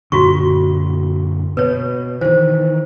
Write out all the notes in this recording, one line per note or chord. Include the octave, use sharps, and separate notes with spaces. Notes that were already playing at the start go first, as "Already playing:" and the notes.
F#2 A#2 D3 F4 F#4 C#6
B2 B4 C#5
D#3 E3 C5